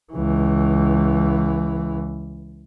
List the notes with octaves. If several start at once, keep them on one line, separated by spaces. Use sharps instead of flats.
C#2 E3